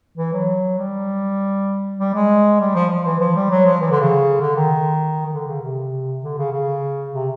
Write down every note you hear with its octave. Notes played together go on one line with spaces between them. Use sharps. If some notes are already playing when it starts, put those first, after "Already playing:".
E3
F#3
G3
G3
G#3
G3
F3
F3
E3
F3
G3
F#3
F3
E3
D3
C#3
D3
D#3
D#3
D3
C#3
C3
D3
C#3
C#3
C3